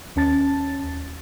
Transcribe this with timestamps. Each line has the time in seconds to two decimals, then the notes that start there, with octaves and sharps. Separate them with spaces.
0.16 D#2 C#4 A5 A6